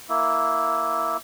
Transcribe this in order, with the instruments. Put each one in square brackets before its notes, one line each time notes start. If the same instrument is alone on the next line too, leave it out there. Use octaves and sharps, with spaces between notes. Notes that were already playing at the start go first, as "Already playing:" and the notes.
[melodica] A#3 E4